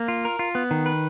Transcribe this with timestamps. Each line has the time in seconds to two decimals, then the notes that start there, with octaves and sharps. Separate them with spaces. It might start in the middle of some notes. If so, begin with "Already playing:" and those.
Already playing: A#3
0.08 F4
0.25 A#4
0.39 F4
0.55 B3
0.71 D#3
0.86 B4